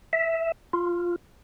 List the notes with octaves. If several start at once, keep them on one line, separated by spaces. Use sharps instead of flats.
E5
F4